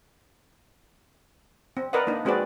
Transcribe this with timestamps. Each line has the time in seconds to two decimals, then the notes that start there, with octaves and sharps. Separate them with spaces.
1.77 C4
1.93 A#4 B4 D5 D#5 F#5
2.07 A#3 D4 D#4
2.25 G#3 C4 F#4 G#4 B4 D5